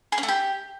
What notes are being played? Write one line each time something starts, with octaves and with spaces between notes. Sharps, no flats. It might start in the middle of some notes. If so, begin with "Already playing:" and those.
G#4
C#4
A3
G4